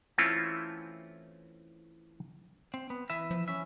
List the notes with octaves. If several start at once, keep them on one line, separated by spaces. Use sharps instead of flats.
E3 A3 C4 C#4 E4 F4
C4
B3
E3 B4 E5
F3
C#4 E5